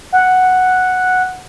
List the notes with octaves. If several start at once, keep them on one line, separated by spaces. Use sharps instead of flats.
F#5